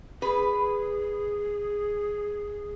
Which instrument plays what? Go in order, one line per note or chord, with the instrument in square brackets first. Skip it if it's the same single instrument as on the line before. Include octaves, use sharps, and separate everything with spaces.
[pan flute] G#4 [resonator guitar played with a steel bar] B4